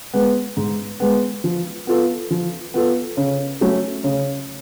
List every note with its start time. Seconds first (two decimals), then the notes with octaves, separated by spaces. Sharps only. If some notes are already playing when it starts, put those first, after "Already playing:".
0.14 G#3 B3
0.57 G#2
1.00 G#3 B3
1.44 F3
1.87 B3 F4 A4
2.31 F3
2.74 B3 F4 A4
3.17 C#3
3.61 F#3 A3 C#4
4.04 C#3